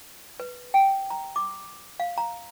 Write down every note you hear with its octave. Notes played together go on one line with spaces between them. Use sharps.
B4
G5
A#5
D6
F5
A#5